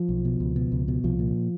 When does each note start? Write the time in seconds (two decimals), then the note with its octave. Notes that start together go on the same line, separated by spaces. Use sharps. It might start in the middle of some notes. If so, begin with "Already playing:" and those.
Already playing: F3
0.09 B1
0.25 B2
0.40 C#2
0.56 B2
0.72 C#2
0.88 B2
1.04 C2 F3
1.19 A#2